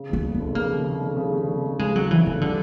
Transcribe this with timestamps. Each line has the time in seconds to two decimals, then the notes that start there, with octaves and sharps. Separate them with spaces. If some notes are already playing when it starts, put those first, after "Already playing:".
Already playing: C#3
0.09 D#2 B3
0.24 F1
0.35 F1 B3
0.54 C#3 A#3
0.71 D#2
0.86 F1
1.01 F1
1.17 C#3
1.32 D#2
1.48 F1
1.64 F1
1.79 C#3 G#3
1.95 D#2 F#3
2.11 F1 E3
2.26 F1 E3
2.41 D3 G3